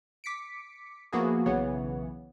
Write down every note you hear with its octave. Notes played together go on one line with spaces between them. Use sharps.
D6 B6 C#7 D7
F3 A#3 B3 E4 F#4 G#4
B1 C#3 E3 B3 C#5 F#5